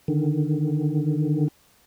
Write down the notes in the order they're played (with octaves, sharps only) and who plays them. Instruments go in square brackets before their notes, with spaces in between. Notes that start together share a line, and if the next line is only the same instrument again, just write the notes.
[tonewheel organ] D3 D#3